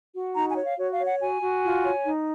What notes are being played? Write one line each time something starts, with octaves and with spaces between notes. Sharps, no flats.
F#4
D#4 A#5
G#5
C#5
F5
F#4 C#5
F5
C#5
F#5
F#4 G#5
F#4
F4
C#5
D#4